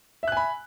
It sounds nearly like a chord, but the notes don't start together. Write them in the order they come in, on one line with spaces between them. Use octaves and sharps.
E5 F#6 G#5 B5